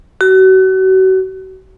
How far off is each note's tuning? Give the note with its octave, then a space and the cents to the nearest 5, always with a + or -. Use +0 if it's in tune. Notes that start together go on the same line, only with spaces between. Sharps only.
F#4 +35